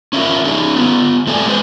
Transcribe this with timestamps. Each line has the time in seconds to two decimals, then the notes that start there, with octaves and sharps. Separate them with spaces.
0.13 C#4 E4 F4 A#4 E5
0.44 C#4 D#4 G#4
0.76 B3 F4
1.27 A2 A3 C4 A4 D5 G#5
1.46 A2 G#3 E4 G#4 B4 C5